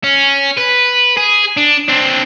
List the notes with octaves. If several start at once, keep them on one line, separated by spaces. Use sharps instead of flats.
C#4
B4
G#4
D4
C4 D4